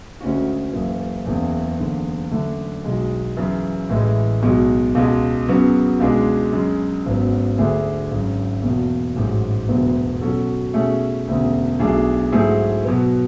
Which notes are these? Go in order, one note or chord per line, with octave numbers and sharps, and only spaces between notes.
D2 C#3 G#3 C#4 F#4
F#1 F#2 E3
F#1 E2 C#3 E3
F#1 E2 D3
F#2 D3 A3 D4
B1 B2 G#3
F#2 C#3 E3
A1 A2 E3 G#3
B1 B2 G#3
C#2 B2 G#3
F#2 C#3 F#3 B3 F#4
C#2 B2 G#3 D4 G#4
F#2 C#3 G#3
G#1 F#2 C#3 F#3 B3
D2 D3 A3 D4 G#4
G#1 F#2 C#3
F#1 E2 B2
A1 G#2 F#3
E1 D2 D3 F#3 B3
B2 F#3 C#4 F#4 A4
B2 A3 C#4 G#4
E1 D2 C#3
B1 B2 A3 D4 G#4
G#2 F#3 A3 E4 G#4
B2 F#3 B3